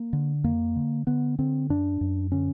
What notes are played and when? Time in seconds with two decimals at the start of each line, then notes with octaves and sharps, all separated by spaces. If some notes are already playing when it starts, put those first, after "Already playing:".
Already playing: A#3
0.13 D3
0.44 F2 A#3
0.76 D3
1.07 D3 B3
1.39 D3 C4
1.70 F#2 D4
2.01 F#2
2.32 D3 C#4